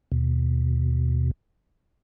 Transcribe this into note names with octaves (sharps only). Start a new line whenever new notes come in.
D#2 B2